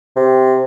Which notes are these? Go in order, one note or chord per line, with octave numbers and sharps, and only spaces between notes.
C3